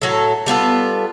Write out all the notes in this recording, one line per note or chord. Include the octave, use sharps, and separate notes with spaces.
A2 F#3 A4
G3 B3 F4 A4